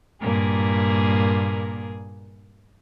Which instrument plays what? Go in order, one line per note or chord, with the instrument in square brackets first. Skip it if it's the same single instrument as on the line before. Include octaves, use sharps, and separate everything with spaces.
[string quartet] G2 A#2 A#3 G#4